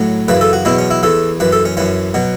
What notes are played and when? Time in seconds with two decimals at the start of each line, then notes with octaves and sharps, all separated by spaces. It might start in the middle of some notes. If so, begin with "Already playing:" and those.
Already playing: A2 F#3
0.28 F#2 C#3 E3 B4
0.41 A4
0.53 F#4
0.65 E2 B2 F#3 E4
0.78 C#4
0.91 E4
1.03 E2 E3 A4
1.40 F#2 E3 B4
1.52 A4
1.65 C#4
1.77 F#2 E3 C#4
2.14 B2 F#3